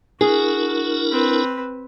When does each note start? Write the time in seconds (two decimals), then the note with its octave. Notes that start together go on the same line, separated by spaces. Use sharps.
0.21 D4 E4 F#4 G#4 A#4
1.10 C4 B4